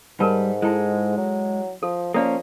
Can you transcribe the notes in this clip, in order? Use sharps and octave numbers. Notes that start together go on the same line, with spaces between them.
G#2 G3 A#4 B4 A5
G#3 E4 A4
F#3
F3 A4
F3 A#3 C#4 A4 D5 F5